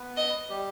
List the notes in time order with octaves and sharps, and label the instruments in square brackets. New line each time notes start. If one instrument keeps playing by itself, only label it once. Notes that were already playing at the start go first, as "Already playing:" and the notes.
Already playing: [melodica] B3 B4
[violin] D#5
[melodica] G3 G4